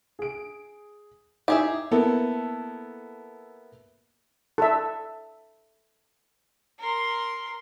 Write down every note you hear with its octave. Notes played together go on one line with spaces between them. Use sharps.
G#4 D7
D#4 E4 G4 G#4 E5
A#3 B3 E4 A4
A4 E5
A#4 C6